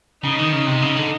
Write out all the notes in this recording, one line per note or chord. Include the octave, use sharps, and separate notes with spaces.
C#3 D#4
D#3
C#3
C3
C#3
D3